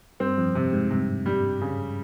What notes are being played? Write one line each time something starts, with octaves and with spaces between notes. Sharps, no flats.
G2 C4
F2
C3
G#2
G2 C3
G2 G3
C#3